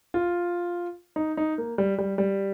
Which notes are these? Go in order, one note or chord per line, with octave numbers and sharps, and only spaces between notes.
F4
D#4
D#4
A#3
G3
G3
G3